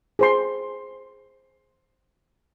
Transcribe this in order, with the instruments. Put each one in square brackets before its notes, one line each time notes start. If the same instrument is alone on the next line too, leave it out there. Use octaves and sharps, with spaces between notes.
[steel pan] G#4 C5 C6